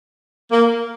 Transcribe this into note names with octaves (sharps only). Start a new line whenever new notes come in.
A#3